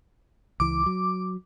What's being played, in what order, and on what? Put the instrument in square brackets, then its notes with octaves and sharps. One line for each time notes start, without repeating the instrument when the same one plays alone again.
[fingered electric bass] C#2 E3 [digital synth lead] D6
[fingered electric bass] F#3